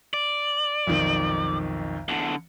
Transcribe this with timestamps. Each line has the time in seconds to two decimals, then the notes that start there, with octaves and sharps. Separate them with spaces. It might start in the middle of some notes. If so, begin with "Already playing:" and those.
0.14 D5
0.87 B1 F2 D#3
2.09 E2 D3